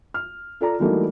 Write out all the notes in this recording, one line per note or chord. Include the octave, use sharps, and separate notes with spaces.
F6
F4 A4 D5 A#5
E3 F#3 G3 A3 A#3 D#4